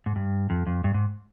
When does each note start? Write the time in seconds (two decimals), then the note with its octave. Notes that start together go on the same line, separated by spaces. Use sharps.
0.06 G#2
0.16 G2
0.50 F2
0.67 F2
0.84 G2
0.94 G#2